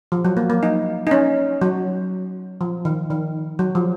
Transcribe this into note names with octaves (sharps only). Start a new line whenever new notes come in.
F3
F#3
A#3
A#3
D#4
D#4
C#4
F#3
F3
D#3
D#3
F#3
F3